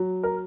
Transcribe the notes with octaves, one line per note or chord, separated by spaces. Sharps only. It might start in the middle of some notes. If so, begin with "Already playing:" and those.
Already playing: F#3
A#4